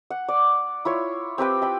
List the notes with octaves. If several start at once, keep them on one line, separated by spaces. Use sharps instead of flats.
F#5
D5
E4 F4 C#5
C4 G4 B4 G5
G5 B5